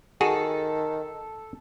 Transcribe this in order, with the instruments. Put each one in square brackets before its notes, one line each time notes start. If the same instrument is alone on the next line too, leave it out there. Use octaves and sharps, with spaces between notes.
[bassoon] D#3 [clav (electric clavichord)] F#4 G#4 [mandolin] A4